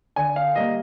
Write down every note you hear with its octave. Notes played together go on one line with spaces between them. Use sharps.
D3 G#5
F5
G3 A#3 D#5